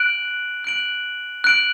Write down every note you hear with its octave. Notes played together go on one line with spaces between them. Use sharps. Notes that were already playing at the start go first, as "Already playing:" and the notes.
Already playing: F#6 D7 F#7
F#6 D7 F#7
F#6 D7 F#7